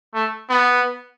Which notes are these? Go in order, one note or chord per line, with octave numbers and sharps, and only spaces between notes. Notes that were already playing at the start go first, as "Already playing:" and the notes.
A3
B3